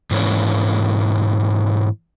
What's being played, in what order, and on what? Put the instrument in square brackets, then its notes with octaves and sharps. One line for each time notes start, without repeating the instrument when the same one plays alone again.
[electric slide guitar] G#2 E3 A#3 C#4 D4